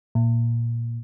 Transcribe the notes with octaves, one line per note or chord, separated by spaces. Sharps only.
A#2